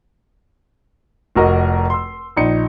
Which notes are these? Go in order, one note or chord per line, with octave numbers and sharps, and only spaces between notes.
F1 F#4 A#4 D#5
C6 E6
A#1 D#4 C#7